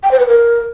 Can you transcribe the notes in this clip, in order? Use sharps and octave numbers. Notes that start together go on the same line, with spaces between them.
G5
C5
B4
A#4